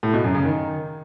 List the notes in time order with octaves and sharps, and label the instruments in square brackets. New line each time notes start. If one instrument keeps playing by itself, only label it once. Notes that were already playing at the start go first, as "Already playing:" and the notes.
[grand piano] A2
B2
F#2
C#3
D#3